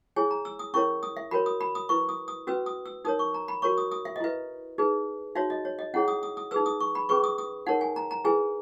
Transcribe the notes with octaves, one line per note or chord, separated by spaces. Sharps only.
E4 G#4 C#5 G#5
A#5
E6
D#6
C#4 E4 A#4 C#5 C#6
D#6
E5
F#4 A#4 C#5 B5
D#6
B5
D#6
E4 B4 C#6
D#6
D#6
C#4 F#4 B4 E6
D#6
E6
D#4 A#4 C#5 D#6
C#6
A#5
B5
F#4 A#4 C#5 C#6
D#6
D#6
E5
D#5
E4 B4 E5
D#4 G#4 B4
D#4 F#4 C#5 E5
D#5
C#5
D#5
C#4 E4 G#4 C#5 F#5
D#6
D#6
D#6
D#4 G#4 B4 E6
D#6
C#6
B5
C#4 G#4 B4 C#6
D#6
D#6
D#4 A#4 C#5 F#5
G#5
A#5
A#5
E4 G#4 B4 G#5